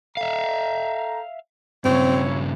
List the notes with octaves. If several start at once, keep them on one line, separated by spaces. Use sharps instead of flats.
A4 E5 F5 G5 A#5
G2 C#3 F#3 C4 E4 C#5